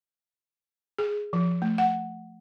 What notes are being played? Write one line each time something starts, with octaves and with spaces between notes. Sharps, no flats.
G#4
F3
A3
F#5